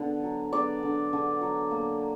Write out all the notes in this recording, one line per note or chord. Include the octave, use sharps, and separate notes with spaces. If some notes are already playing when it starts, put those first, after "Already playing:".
Already playing: D3 B3
F#3
B3 D5
D3
D3
F#3
A#3